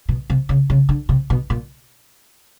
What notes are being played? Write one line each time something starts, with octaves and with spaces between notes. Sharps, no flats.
B2
C3
C#3
C#3
D3
C3
B2
A#2